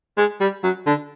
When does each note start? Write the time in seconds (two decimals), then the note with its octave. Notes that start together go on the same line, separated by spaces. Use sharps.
0.18 G#3
0.41 G3
0.64 F#3
0.86 D3